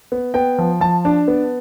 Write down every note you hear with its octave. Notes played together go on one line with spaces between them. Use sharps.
B3
B3 G5
F3
F3 A5
D4
B3